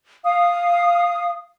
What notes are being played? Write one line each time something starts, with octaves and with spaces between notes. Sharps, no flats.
F5 D#6